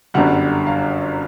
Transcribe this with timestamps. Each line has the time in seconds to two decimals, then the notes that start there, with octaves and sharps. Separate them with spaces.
0.14 G1 F#2 D3 G3 F#5
0.67 F5